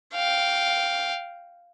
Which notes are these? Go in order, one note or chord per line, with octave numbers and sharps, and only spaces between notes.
F5 G5